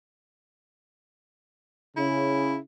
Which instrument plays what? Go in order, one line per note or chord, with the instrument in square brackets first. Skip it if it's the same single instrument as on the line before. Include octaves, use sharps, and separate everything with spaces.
[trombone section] C#3 [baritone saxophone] E4